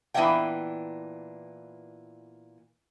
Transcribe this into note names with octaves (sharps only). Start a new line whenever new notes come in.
A#2 E3 B3 D4 E5 G5